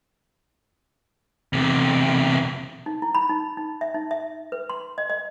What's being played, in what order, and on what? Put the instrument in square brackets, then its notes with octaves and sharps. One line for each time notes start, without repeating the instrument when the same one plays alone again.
[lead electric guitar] E2 C3
[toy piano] D#4
E4
B5
D#4
D#4
E5
D#4
E5
B4
C6
D#5
D#5